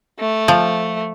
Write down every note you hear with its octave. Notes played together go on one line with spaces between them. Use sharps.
A3
F3